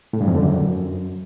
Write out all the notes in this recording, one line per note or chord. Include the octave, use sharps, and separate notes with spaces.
A2
G2
F2
D3
F#2